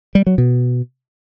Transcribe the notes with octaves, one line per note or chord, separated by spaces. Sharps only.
G3
F#3
B2